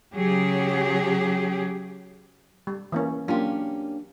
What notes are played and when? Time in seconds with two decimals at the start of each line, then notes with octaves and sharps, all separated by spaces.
0.15 C#3 F#3 G4 G#4
2.67 G3
2.92 E3 A#3 C#4
3.28 F#3 A#3 C#4 D4 F4 G4